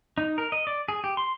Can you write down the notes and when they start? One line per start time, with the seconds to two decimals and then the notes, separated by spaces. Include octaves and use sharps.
0.18 D#4
0.38 A#4
0.52 D#5
0.67 D5
0.88 G#4
1.04 G4
1.17 C6